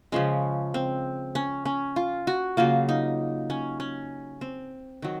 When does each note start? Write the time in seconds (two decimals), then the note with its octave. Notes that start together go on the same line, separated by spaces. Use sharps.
0.12 C#3 F3 G#3 C#4
0.74 C4
1.35 C#4
1.65 C#4
1.96 F4
2.27 F#4
2.57 C#3 F#3 A#3 F4
2.89 D#4
3.50 C#4
3.80 C#4
4.41 C4
5.02 D#3 F#3